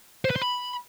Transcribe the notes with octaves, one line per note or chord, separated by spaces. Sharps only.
C5
B4
C5
B5